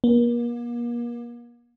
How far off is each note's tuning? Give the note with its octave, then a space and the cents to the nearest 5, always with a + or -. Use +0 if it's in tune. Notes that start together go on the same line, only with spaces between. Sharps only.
A#3 +40